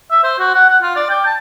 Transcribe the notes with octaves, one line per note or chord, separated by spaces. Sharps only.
E5
C5
F#4
F#5
F#5
F4
D5
G5
A5